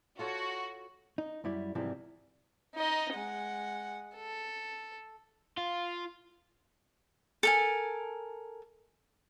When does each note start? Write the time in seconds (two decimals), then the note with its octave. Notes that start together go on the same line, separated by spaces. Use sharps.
0.19 F4 F#4 A4 C#5
1.18 D#4
1.44 F#2 G3 E4
1.75 G#2 C3 E3 F3 G3 E4
2.75 D#4 D#5
3.14 G#3 F#5
4.16 A4
5.57 F4
7.43 A4 A#4 G#5